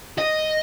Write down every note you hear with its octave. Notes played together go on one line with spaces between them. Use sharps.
D#5